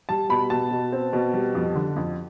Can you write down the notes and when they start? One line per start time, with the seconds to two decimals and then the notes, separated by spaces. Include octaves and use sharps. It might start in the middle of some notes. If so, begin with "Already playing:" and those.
0.09 G3 A5
0.29 B2 B5
0.50 B2 A5
0.71 B2
0.92 C4
1.13 B2
1.34 G3
1.55 F2
1.75 D3
1.96 F2